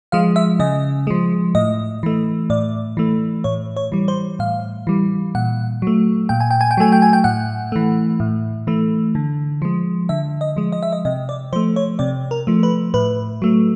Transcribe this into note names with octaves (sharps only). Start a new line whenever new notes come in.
F3 G#3 F5
E5
C#3 D#5
F3 G#3
A2 D#5
E3 A3
A2 D5
E3 A3
A2 C#5
C#5
E3 G3
C5
A2 F5
E3 G3
A#2 F#5
F#3 A3
A#2 G5
G#5
G5
G#5
G5
F#3 A3 G#5
G5
G#5
G5
A2 F#5
E3 A3
A2
E3 A3
D3
F3 G#3
D3 E5
D#5
F3 G#3
D#5
E5
D#5
C3 D#5
D5
F3 A3 C5
C#5
C3 D5
A#4
F3 A3
B4
A2 B4
F#3 A3